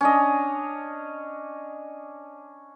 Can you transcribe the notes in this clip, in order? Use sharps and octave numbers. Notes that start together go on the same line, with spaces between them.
C#4 D4 D#5